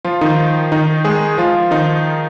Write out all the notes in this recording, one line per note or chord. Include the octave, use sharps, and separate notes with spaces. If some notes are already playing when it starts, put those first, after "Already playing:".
F3 F4
D#3 D#4
D#3 D#4
G#3 G#4
F3 F4
D#3 D#4